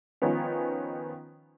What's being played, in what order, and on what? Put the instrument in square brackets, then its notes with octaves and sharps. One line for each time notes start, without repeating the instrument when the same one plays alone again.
[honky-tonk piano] D#3 F3 B3 C#4